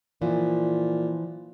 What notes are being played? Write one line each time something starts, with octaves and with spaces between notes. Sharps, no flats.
A#2 E3 F3